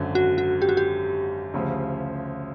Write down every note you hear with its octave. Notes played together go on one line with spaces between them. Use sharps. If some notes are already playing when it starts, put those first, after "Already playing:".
Already playing: G#1 F#2 D3 F#3
F#4
F#4
G4
F#4
G4
D2 C#3 F3